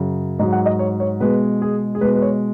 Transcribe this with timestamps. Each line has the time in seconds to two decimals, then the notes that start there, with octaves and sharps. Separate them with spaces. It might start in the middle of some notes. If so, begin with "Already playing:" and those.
Already playing: F#2 C#3 F#3
0.39 G#2 D#5
0.43 F#3
0.52 F#5
0.66 D#5
0.79 C#5
1.00 C#5
1.20 B2 G#3 B4
1.62 G#4
1.95 G#4
2.01 B2 G#3 B4
2.15 B4
2.22 C#5